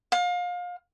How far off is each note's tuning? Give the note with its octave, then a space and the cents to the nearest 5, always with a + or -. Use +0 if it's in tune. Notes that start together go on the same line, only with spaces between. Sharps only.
F5 +30